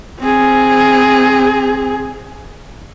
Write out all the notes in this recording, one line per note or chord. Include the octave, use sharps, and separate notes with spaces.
C4 G#4